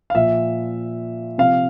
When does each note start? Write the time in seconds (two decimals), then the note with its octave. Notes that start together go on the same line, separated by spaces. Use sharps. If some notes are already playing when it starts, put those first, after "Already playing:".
0.10 F5
0.15 A#2 F3 E5
1.38 C3 F3 F5